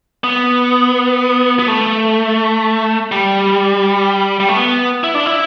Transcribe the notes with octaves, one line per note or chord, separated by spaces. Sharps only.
B3
B3
A3
G3
G3
A3
B3
E4
D4
E4